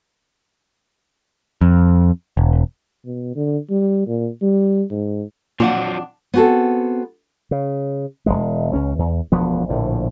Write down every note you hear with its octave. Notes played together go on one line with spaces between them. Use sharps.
F2
E1
B2
D3
G3
A#2
G3
G#2
F2 A#2 F3 F#3 D4 F#5
B3 C4 F#4 G#4 A4
C#3
E1 C2 G#3
C#2 C#4
E2
E1 D2 F3 B3
A#1 A2 D3 F3